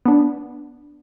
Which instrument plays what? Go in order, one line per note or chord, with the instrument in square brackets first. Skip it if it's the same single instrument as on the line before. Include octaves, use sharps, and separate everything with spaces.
[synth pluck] B3 D4